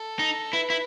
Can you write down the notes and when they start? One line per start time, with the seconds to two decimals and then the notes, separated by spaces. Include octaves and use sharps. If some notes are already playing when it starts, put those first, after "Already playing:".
Already playing: A4
0.19 D#4
0.53 E4 B4
0.70 E4